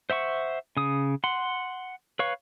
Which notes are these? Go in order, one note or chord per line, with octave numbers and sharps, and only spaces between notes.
C5 E5 F#5 C#6
C#3 D#6
F#5 C6
B4 C#5 F5 C#6